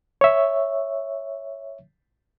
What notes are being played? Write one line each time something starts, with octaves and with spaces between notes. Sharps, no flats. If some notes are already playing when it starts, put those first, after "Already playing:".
C#5 E5